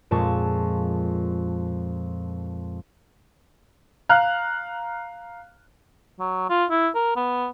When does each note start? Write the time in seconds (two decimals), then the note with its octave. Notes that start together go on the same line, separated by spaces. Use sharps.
0.11 F2 A#2 G#3 A5 C#6
4.09 F5 A#5 F6 F#6
6.19 F#3
6.49 F4
6.70 E4
6.95 A#4
7.16 B3